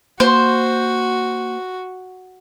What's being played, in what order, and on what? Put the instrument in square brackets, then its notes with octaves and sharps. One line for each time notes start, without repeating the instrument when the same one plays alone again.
[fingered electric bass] A#3 [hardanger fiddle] F#4 [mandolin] C5